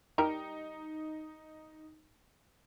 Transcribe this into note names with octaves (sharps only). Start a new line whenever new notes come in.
G3 D#4 G4 A#4